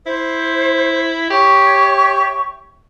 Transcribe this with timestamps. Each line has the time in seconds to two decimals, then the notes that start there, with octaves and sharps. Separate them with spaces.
0.06 E4 C5
1.30 G4 C#5 E5 C#6